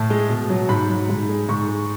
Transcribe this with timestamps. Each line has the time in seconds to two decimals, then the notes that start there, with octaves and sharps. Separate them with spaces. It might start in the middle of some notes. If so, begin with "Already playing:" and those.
Already playing: A2 A5
0.10 G#3
0.29 B2
0.50 F#3
0.69 G#2 B5
0.89 F#3
1.09 G#2
1.29 G#3
1.49 G#2 C#6
1.69 G#3